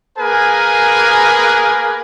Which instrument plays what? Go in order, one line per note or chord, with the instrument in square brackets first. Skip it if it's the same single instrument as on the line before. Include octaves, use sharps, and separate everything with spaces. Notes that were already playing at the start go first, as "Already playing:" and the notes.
[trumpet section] A#3 G#4 A#4 B4 G#5